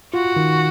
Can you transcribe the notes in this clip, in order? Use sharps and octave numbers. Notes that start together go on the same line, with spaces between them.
F4 F#4
D#3